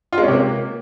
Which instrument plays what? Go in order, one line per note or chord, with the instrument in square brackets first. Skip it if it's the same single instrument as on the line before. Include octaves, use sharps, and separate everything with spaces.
[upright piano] F4
G#3
C#4
C3
A#3